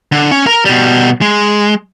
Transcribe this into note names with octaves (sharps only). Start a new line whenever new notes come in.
D3
C#4
A#4 A#5
B2 G3
G#3